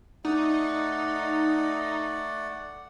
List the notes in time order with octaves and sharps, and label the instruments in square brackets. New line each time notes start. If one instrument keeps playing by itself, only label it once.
[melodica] A3 D5 F#5 [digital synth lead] D#4